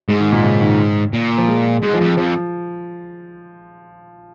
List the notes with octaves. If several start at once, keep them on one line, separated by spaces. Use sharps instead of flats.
G#2 G#3
D#3
A#2
C#3
D#3
A#2
F3
G#3
G#2 G#3
F3
F2 G#3
F2 F3